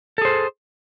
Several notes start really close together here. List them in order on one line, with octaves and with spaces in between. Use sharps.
A4 G#4 C5